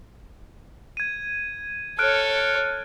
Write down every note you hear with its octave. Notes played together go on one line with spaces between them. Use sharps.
G#6 D#7
A4 C#5 F6 F#6 D7